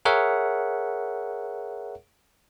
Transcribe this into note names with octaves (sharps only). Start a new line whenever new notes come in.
G#4 A#4 C#5 E5 F#5